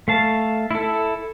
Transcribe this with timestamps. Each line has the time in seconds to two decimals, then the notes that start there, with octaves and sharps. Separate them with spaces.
0.08 A3 F5 A5
0.71 E4 A4